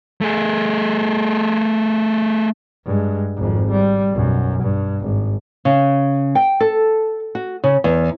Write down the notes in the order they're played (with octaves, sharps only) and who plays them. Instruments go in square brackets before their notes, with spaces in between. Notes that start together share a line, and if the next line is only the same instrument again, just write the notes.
[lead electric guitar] A3 G#4
[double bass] G2 G#3
G#1 F2
G3
B1 F#2
G2
G#1
[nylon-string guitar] C#3
G5
A4
F#4
C#3
E2